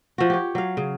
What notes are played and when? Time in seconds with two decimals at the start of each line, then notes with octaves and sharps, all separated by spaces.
0.18 F3 F#4
0.30 G4 C#5
0.55 F#3 F5
0.77 C#3